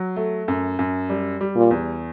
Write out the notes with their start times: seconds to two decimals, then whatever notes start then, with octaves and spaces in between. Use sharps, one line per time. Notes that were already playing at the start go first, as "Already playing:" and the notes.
Already playing: F#3
0.16 A3
0.48 F#2
0.79 F#2
1.10 G3
1.41 G3
1.56 A#2
1.71 E2